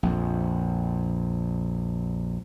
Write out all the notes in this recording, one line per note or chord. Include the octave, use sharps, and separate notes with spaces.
A#1 F2